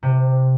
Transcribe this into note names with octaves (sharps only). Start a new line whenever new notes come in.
C3